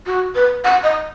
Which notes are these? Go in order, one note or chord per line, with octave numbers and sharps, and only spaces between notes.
F#4
B4
F#5
D#5